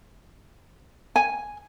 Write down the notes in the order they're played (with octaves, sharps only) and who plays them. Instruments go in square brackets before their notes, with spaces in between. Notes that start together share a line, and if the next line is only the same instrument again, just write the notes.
[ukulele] G#5